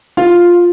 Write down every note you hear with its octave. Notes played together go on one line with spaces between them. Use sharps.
F4